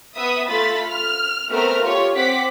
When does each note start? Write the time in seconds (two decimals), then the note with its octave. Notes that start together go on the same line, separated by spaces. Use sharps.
0.16 B3 B4 E5 D#6
0.48 A3 F4 B5 A6 B6
0.89 F6
1.50 A3 B3 C4 A#4 F6
1.83 F4 G4 C#5
2.16 C4 F#5 D6 B6